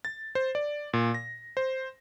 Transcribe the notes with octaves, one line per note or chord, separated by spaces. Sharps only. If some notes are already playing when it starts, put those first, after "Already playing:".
A6
C5
D5
A#2
A#6
C5